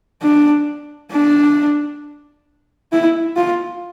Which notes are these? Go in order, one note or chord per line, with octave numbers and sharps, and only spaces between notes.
D4
D4
E4
F4